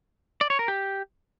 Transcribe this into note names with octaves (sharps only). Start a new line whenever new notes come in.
D5
C#5
A#4
G4